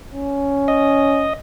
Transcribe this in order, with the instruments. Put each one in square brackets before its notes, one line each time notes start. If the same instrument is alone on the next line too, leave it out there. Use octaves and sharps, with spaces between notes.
[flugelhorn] C#4
[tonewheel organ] D#5